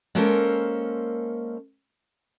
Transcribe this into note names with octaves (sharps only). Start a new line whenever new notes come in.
G#3 A#3 C#4 A4 A#4 C5